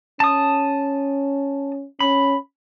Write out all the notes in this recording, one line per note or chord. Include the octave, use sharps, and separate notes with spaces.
C#4 A5 D#6
C#4 B5